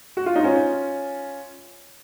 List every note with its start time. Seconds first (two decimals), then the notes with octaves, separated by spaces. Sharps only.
0.17 F#4
0.26 F4
0.36 D#4
0.44 C#4 F4